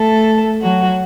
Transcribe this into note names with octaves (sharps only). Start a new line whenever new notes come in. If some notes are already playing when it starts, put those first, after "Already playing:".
Already playing: A3 A4
F#3 F#4